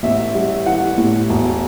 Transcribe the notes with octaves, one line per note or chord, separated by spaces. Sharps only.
A1 E5
G3
E3 F#5
A2
E1